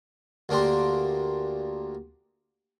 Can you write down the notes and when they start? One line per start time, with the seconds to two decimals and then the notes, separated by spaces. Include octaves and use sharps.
0.49 D2 A#3 D4 G4 C6